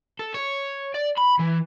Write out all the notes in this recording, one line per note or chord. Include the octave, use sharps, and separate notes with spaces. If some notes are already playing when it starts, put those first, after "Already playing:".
A4
C#5
D5
B5
E3